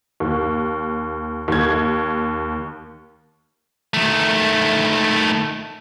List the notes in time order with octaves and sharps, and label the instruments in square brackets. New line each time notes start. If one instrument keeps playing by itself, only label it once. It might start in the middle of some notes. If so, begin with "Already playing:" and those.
[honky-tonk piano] D#2
D#2 G#6
[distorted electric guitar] D#3 A3